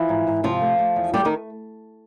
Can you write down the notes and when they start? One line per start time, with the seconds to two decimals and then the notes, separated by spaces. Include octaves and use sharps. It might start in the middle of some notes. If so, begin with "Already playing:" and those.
Already playing: E3 F3 E4
0.09 G#2
0.27 G#2
0.43 C3 F3 F4
0.61 A3
0.79 A3
0.96 E2
1.14 G3 A3 G4
1.25 D#3 D#4